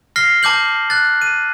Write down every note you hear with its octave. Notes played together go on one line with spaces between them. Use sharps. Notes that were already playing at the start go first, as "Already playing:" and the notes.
F6 A#6 C7 G7
A5 D6 G6 F#7
F#6 A6
D#7